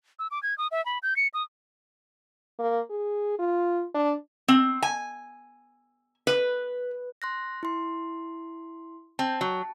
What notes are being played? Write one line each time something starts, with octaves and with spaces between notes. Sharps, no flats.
E6
D6
G#6
D#6
E5
B5
G6
C#7
D#6
A#3
G#4
F4
D4
C4
G#5
B4
C6 F#6 A#6
E4 C6
C4 A5
F#3